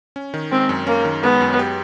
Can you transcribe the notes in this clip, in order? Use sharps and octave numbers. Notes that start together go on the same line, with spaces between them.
C#4
D#3
G#3 C4
F#2
A#3 C#4
D#3
G#3 B3
F#2
G4